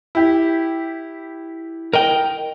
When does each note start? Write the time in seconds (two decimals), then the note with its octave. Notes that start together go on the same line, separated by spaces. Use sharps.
0.15 E4 G4
1.93 A#4 D#5 G5